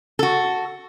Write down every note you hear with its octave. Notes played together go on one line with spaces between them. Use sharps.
F#4 A4